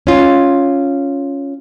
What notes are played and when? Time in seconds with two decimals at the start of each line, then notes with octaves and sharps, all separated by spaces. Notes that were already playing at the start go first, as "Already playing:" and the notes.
0.07 C#4 F4